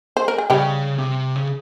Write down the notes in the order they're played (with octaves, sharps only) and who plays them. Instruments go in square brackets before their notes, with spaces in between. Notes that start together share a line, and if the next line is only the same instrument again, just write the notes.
[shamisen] C5
A#4
G#4
[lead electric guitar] C#3 [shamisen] G3 G4
[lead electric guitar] C3
C#3